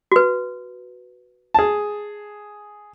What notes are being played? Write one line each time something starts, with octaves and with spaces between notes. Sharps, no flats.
F#4 B4
G#4 A5